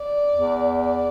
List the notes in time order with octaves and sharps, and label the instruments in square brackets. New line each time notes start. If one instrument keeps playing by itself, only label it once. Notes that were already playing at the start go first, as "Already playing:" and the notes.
Already playing: [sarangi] D5
[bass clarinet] E2
[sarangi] D5